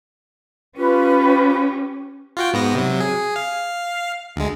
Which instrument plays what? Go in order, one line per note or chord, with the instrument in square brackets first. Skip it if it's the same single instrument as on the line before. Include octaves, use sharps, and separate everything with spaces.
[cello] C#4 G4 [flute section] F4 B4
[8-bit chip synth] F4 F#4 G5
G#2 B3 A#6
C3 F#3
G#4
F5
D2 G#3